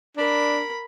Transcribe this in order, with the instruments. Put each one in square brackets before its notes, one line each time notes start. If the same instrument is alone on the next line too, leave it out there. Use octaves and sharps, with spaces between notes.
[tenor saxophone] D4 [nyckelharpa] A#4 B5